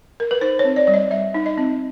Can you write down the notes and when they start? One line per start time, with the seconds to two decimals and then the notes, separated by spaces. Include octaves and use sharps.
0.20 A#4
0.31 B4
0.41 D#4 C5
0.59 C#5
0.64 C4
0.76 D5
0.87 G3 D5
0.94 D#5
1.11 G3 E5
1.34 D#4
1.46 D#5
1.58 C4